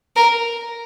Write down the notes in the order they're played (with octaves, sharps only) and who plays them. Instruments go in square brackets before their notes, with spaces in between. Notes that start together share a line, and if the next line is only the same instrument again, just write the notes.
[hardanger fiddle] A#4